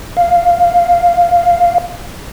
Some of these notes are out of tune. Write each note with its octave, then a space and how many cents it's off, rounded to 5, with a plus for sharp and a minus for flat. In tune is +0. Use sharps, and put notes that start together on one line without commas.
F5 +0